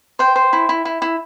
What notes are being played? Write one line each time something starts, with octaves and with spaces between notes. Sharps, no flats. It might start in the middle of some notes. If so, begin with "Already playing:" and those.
C5 G5
C5
E4
E4
E4
E4